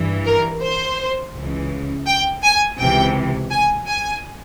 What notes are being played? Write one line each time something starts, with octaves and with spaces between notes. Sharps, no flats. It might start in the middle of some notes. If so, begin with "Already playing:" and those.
Already playing: G2 E3
A#4
C5
C#2 C#3 E3
G5
G#5
C#2 C3 E3 G5
G#5
G#5